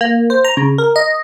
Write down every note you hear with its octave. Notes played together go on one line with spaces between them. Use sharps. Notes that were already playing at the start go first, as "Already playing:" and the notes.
A#3
C5
A#5
C#3
A#4
D#5